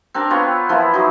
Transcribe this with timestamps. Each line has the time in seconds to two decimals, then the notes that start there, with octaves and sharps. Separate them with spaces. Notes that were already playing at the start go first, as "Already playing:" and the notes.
0.14 C4 D4 A#4
0.30 B3 F4 C5 C#5
0.69 E3 F3 A#3 E4
0.94 F#3 D#4